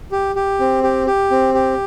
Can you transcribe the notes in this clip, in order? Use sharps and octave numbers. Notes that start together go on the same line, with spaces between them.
G4
G4
C4
G4
G4
C4
G4